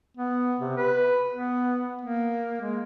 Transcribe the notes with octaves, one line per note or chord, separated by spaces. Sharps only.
B3
C3
B4
B3
A#3
G#3